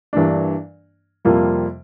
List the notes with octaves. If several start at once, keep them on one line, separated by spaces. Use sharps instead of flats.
G2 E3 A#3 D4
F2 C3 G3 A#3 F4